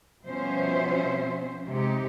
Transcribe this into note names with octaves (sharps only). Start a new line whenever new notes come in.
B2 F3 G3 C#4 C5 E5
C3 G#3 D#4 G4